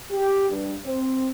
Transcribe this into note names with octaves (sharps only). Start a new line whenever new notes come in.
G4
G2
C4